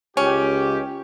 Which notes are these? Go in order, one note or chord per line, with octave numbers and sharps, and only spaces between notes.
C#2 C#4 G4